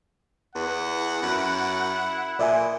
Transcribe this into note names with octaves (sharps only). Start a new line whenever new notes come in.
E2 F#5
F#2 E4
A#2 D5 E5 G#5